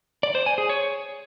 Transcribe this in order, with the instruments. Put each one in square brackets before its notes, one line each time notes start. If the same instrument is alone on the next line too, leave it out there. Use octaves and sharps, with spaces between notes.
[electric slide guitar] D5
C5
G#5
G#4
C#5